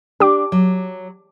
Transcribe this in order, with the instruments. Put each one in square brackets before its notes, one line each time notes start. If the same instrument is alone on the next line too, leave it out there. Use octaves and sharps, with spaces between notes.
[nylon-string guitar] D4 [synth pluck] G4 D6
[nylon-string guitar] F#3